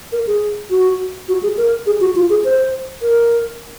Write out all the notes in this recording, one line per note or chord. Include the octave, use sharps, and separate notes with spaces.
A#4
G#4
F#4
F#4
G#4
A#4
G#4
F#4
F4
G#4
C5
A#4